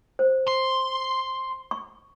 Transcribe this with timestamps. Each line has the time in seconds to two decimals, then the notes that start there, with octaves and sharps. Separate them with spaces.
0.19 C5
0.48 C6
1.71 C#6